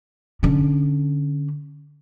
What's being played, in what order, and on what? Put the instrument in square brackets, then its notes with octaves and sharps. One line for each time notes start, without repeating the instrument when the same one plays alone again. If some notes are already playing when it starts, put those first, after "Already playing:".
[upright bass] D3 C#4